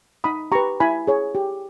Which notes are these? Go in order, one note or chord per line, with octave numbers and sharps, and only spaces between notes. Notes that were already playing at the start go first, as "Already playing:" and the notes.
D#4 B5 D#6
G4 B4 A#5 C#6
E4 G#5 B5
G#4 C#5
G4